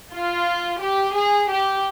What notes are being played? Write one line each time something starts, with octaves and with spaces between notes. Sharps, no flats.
F4
G4
G#4
G4